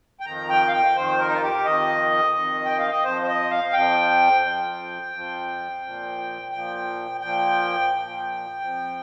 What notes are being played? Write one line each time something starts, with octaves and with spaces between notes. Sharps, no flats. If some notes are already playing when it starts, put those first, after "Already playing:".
G5
F2 D#3 A#5
G5
F5
G5
F2 D#3 C5
A#4
D#4
F4
G4
F2 D#3 D#5
F2 D#3
G5
F5
D#5
F2 F3 C5
C5
D#5
F5
F2 F3 G5
F2 F3
F2 F3
A#2 F3
A#2 F3 G5
A#2 F3 G5
A#2 F3
F2 F3